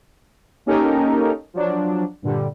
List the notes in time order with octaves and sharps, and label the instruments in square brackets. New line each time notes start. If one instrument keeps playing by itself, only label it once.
[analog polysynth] A#3 C#4 D#4 G4 A4 A#4
F3 F#3 D4
G2 A#2 D3 G3